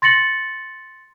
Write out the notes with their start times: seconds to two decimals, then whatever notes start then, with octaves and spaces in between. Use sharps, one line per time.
0.02 C6 A6 A#6 C#7 F#7